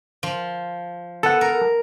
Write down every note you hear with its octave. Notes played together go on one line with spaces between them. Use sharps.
F3
B3 A4 F#5
A#4